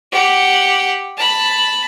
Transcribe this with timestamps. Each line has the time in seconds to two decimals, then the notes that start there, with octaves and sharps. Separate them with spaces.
0.12 G4 F#5
1.17 A5 B5